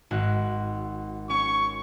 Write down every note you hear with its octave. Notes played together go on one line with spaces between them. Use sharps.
G#1 F#4 F#6
C#4 C#6